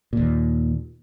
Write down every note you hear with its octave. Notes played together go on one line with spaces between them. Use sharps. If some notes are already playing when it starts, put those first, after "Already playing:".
D#2 A#2